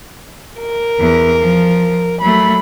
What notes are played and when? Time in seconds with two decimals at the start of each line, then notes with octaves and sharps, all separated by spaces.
0.60 A#4
0.99 E2
1.40 F3
2.21 F#3 A3 B5